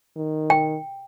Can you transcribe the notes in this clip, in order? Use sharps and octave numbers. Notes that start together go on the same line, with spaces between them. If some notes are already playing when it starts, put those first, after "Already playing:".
D#3
G5